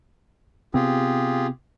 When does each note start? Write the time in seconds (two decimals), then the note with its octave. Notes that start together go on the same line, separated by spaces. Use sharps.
0.74 C3 B3 C4 F4 G4 G#4